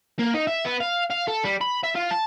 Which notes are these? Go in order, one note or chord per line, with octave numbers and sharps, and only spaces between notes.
A#3
D#4
E5
B3
F5
F5
A4
G3
B5
E5
F4
A5